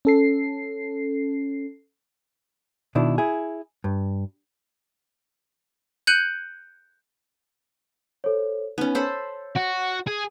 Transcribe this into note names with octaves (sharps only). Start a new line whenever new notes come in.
C#4 A4 C7
B2 D#3 D4 E4
E4 G#4
G2
F#6 G6 C#7 D#7 F#7
A4 C5 C#5
B3 C#4 D#4
A4 C5 C#5 B5
F#4
G#4